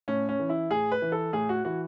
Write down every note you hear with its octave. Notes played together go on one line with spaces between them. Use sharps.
A2 C#4
C#4
E3
E4
A2 G#4
B4
E3
A4
A2 G#4
F#4
E3 F#4